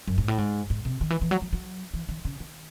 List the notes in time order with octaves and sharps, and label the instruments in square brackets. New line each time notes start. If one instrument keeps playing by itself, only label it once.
[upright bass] F#2
G#2
A2
G#2
G#2
C3
D#3
E3
E3
F#3
F#3
F#3
E3
D#3
C#3
D#3